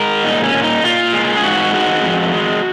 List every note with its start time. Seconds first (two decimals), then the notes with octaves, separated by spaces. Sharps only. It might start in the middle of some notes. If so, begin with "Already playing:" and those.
Already playing: G#3 A#4
0.23 A#2 D#4
0.44 C#4
0.54 A#2
0.63 D#4
0.84 A#2 F4
1.13 G#3
1.37 G#4
1.43 G#2 F#4
1.74 G#3 F#4
2.04 F2
2.33 G#3